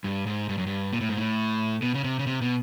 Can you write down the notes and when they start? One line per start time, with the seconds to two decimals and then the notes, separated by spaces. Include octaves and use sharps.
0.04 G2
0.26 G#2
0.49 G2
0.58 F#2
0.67 G2
0.93 A#2
1.01 A2
1.09 G#2
1.17 A2
1.82 B2
1.94 C#3
2.04 C3
2.19 C#3
2.27 C3
2.41 B2